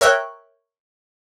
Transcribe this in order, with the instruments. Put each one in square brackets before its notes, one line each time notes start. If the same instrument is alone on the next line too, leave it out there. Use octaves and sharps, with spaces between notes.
[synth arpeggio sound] A#4 C#5 E5 G5 F#6